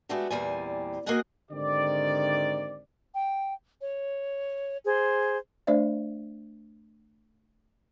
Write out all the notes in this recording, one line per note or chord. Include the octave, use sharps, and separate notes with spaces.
G#3 A3 B3 D4 F#4 G4
E2 A#2 G3 C4 G#5
A#3 F#4 G#4 D#5 F#5 G#5
G#2 D3 D#3 C4 G4 D5
G5
C#5
G#4 C5
A3 D4 C5 D5 E5